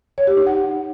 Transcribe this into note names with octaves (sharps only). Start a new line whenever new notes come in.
C#5
G4
D#4
F#5